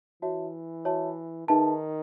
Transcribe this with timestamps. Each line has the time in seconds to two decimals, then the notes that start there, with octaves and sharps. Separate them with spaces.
0.22 E3 F#4 C#5 E5 A5
0.85 F#4 C#5 E5 A5
1.48 D#3 D#4 G#4 B4 E5 A5